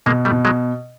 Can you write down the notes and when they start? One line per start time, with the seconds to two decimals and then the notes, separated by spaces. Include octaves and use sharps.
0.06 B2 G#3 A#3
0.25 G3 A3
0.32 B2
0.45 F#3 G#3